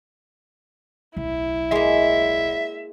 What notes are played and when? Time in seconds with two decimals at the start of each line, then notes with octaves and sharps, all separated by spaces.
1.17 D1 B1 E4
1.71 G#3 A#3 E5